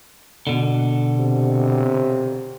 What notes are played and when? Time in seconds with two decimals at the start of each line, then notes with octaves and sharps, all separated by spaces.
0.47 B2 D3
1.18 C3